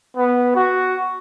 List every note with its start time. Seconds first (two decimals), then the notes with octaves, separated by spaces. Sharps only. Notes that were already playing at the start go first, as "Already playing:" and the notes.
0.17 B3
0.55 F#4